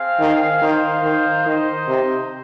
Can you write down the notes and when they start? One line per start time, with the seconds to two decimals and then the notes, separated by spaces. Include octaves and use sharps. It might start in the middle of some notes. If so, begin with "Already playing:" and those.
Already playing: C4 G#4 F5
0.20 D#3
0.61 D#3 D#4 C5 F5
1.03 D#3
1.46 D#3 D#4 C5 D#5
1.88 C3